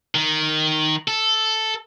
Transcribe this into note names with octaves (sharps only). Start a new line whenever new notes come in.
D#3
A4